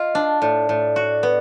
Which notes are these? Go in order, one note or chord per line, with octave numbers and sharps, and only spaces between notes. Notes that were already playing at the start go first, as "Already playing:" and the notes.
Already playing: F4 D#5
D4
A2 D5
A2
F#4
B3